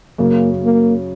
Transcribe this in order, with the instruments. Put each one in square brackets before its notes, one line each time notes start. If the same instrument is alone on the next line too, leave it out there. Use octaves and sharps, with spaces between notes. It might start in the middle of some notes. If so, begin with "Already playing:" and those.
[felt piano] F#2 C#3 F#3 [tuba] A#3
[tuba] A#3